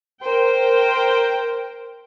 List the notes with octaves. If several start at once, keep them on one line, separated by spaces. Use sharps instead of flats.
A#4 C5 G5